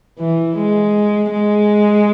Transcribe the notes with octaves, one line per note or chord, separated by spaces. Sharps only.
E3
G#3
G#3